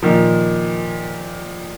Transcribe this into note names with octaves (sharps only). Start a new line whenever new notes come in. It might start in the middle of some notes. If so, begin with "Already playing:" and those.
A#2 D#3 F3